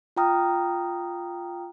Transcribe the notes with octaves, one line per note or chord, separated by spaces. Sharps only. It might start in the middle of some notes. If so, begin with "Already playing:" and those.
F4 F5 G5 A#5 D#6 F6